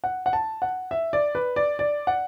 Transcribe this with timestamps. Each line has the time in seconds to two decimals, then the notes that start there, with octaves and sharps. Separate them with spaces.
0.04 F#5
0.26 F#5
0.33 A5
0.62 F#5
0.91 E5
1.13 D5
1.35 B4
1.56 D5
1.79 D5
2.07 F#5